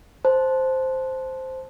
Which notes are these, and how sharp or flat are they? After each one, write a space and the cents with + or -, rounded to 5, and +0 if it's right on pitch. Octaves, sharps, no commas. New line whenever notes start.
C5 +0 A5 -15